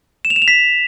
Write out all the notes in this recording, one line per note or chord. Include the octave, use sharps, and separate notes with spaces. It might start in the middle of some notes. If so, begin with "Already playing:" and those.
E7
F7
E7
F7
B6